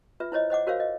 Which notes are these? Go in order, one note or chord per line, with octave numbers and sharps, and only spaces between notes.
F4 B4 E5
E4 C5 C#5 D#5
C5 D#5 F#5 D6
F#4 A#4 C5 C#5 F5
D#5